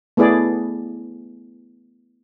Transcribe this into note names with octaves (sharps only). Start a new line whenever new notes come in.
A3 B3 E4 G#4 D5